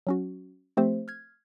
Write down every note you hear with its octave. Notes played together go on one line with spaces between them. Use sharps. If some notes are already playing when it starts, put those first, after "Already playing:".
F#3 C#4 F#4
F3 A3 C4 G4 C5 E5
F6 G#6